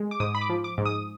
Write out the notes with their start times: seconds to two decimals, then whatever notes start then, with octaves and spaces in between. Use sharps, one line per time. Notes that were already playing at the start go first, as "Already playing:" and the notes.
Already playing: G#3
0.11 D6
0.20 G#2 D#6
0.35 B5
0.41 D6
0.49 F3
0.64 D6
0.78 G#2
0.85 D#6